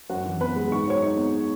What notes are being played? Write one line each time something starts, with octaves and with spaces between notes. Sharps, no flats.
F#2 F#4 F#5
E3
B3 B4 B5
G#3
G#2 C#6
F#3 C#5 C#6
D#4
B3